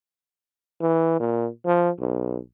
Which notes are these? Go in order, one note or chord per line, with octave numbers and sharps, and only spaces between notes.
E3
A#2
F3
B1